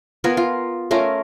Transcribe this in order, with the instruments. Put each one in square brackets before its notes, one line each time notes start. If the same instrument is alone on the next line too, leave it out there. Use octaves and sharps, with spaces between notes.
[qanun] B3 F4 A#4 G#5
F4
A3 C#4 F4 A#4